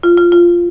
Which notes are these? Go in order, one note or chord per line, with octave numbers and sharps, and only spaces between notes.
F4
F4
F4